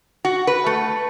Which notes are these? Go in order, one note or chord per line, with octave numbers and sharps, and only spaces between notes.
F#4
B4
A3